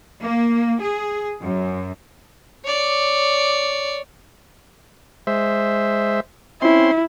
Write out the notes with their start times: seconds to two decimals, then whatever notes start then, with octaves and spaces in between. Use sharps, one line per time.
0.21 A#3
0.81 G#4
1.41 F#2
2.65 C#5 D5
5.27 G#3 C5 E5
6.62 C4 C#4 E4 C6